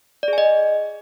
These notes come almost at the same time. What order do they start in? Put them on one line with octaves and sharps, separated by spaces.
D5 G#4 G#5 D#5